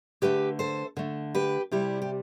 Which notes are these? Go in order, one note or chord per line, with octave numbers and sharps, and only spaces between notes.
D3 A3 G4 B4
A4 C5
D3 A3
G4 B4
C3 G3 E4 G4
G4